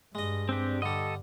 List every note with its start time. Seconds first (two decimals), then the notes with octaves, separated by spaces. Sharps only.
0.15 G2 G#3 D#5
0.49 C4 D4 G4
0.82 D3 G3 A4 D#5